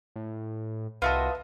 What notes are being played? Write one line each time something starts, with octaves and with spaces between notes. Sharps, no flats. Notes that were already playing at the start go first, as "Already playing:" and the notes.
A2
C2 F4 F#4 B4 D#5 E5 A5